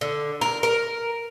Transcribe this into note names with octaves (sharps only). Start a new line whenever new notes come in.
D3
A#4
A#4